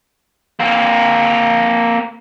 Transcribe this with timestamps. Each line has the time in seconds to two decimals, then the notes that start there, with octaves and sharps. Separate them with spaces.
0.60 A#3 C4